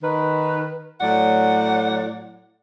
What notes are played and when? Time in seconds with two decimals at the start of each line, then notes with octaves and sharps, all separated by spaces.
0.03 D#3 B4
1.01 A2 F#3 D5 F#5